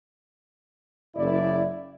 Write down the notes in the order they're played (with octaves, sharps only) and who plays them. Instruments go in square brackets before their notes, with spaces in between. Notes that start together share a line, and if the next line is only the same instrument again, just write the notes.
[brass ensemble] F#1 E4 D5